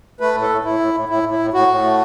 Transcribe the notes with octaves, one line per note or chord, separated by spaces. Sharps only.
A3 B4
A2
A4
A2
A2 E4
A2
A2
A2 E4
A2
E4
A2
A2 F#4
A2
A3